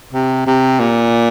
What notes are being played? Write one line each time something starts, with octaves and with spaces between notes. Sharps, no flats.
C3
C3
A#2